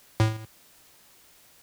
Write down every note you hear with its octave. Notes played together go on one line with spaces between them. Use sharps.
A2